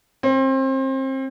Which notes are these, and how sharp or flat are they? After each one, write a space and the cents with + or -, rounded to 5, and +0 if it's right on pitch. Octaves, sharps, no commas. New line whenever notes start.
C4 +30